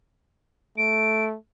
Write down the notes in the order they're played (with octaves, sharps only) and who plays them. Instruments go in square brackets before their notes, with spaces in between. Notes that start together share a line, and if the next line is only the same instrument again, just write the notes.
[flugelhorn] A3 [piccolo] D7